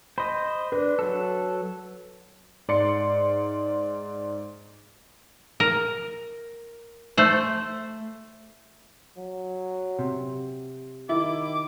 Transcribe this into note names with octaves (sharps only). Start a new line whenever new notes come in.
C5 D#5 B5
D4 B4
F#3 A4
G#2 D5 C6 C#7
A#4
A3 C5
F#3
C3
D#3 E4 D6